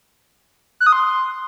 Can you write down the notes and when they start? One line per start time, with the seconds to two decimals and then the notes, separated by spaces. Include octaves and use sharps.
0.80 F#6
0.86 D#6
0.93 C6